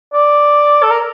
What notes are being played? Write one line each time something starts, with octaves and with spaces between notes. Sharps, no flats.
D5
A4
A#4